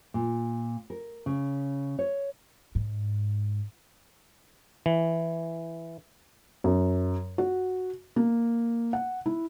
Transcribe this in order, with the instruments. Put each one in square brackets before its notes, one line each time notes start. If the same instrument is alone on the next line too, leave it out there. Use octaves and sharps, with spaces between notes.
[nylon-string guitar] A#2
A#4
C#3
C#5
[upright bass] G#2
[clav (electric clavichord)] E3
[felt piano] F#2
F#4
A#3
F#5
E4